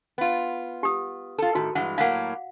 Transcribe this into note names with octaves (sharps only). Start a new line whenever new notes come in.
B3 F4
G4 D#6
F4 A4
A2 D#3 F#4
G2 E3 G#3 F#5
A2 F#3 A#3 F5 F#5